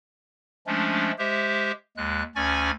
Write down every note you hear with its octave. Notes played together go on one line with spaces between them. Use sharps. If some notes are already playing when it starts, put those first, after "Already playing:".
F3 G#3 A3 C#4 D4
G#3 G4 C5 E5
D#2 G#3 F#6
D2 C#4 D5 G#5 C#6 G#6